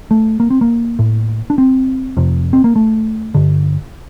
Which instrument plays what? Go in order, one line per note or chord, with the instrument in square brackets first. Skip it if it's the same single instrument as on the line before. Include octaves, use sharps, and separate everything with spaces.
[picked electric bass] A3
A#3
C4
A#3
A2
D4
C4
F2 C3
C4
A#3
A3
G2 D3